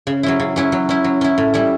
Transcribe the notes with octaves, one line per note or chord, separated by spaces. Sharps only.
C#3
F#3 C#4 E4
C#3
F#3 C#4 E4
F#3
C#4 E4
F#3
C#4 E4
A2
G3 C#4 E4